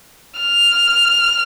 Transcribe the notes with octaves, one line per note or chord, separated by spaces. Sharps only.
F6